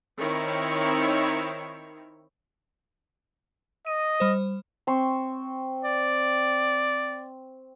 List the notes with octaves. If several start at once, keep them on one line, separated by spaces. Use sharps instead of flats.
D#3 C4 E4 C#5
D#5 D#7
G3 C5
C4 C6 C#6
D5